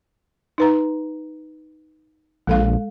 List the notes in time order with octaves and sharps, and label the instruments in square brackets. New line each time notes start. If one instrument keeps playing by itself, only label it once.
[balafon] D#4 B4 A#5
[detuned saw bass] A#1 [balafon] G#3 A4 F5